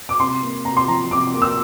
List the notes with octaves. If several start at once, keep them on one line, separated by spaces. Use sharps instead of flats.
D6
C3 C6
A#3
C3 A#5
C6
F3 A#5
C3 D6
A#3
E6